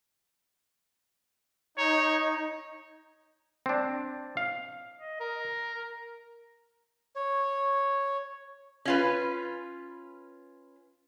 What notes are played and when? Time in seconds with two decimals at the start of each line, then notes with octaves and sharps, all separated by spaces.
1.78 D#4 C#5
3.66 C4 D4
4.37 F5
4.98 D#5
5.20 A#4
7.16 C#5
8.85 C#4 F4 B4